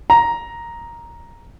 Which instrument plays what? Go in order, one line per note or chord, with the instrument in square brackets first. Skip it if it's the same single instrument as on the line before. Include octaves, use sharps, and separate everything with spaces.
[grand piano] A#5